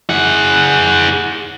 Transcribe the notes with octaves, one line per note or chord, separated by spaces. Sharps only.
G#4 F#5